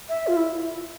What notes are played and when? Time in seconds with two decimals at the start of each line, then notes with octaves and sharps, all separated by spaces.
0.09 E5
0.27 F4
0.36 E4